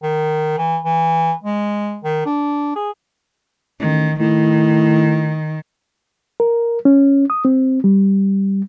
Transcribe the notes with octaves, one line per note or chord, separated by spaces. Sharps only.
D#3
E3
E3
G#3
D#3
D4
G#4
A1 D#3
A2 D#3
A#4
C#4
D#6
C4
G3